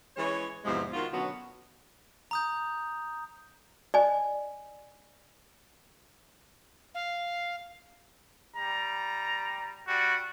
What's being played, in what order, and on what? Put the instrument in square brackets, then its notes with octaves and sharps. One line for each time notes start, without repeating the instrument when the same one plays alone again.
[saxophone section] E3 G#3 C#4 C#5
E2 G#2 C3 E3 F3 G#3
D#3 F4 F#4
B2 D3 F#3 B3 C#4 F#4
[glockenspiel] A#5 D#6 G6
[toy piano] D5 D#5 G#5
[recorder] F5
[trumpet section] G3 A#5
G3 F#4